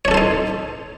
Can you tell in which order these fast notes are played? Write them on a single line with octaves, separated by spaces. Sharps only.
C#5 D4 A4 C5 D#4